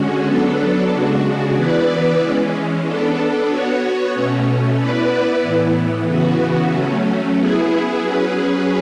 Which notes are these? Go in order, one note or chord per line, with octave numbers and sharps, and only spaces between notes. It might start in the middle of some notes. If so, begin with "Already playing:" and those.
Already playing: D3 G#3 C#4 F#4
F#3 B3 D4 A4
C#3 G#3 D4 F#4
E3 B3 E4 B4 D5
E3 G#3 C#4
B3 D4 A4
B3 F#4 C#5
B2 A3 C#4
B3 E4 B4 D5
A2 E3 B3
C#3 E3 B3 F#4
F#3 A3 C#4
B3 E4 G#4
F#3 C#4 G#4 B4